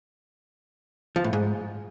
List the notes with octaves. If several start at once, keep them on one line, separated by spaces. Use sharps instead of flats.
F3
A2
G#2